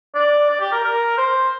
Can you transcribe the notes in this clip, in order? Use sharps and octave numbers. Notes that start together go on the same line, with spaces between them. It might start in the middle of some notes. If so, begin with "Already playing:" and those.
D5
D5
G4
A#4
A#4
C5